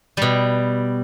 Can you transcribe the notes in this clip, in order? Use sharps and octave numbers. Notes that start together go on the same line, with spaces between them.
B2 G3